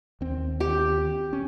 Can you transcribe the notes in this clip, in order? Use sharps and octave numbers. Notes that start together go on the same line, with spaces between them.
D#2 C4
G4
C#4